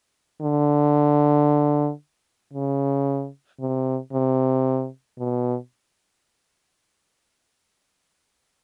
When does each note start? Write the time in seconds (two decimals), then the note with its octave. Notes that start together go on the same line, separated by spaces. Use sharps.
0.42 D3
2.54 C#3
3.60 C3
4.13 C3
5.19 B2